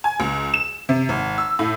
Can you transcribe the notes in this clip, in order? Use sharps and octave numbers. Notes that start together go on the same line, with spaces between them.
G#5
C#2
E7
C3
G#1
E6
A2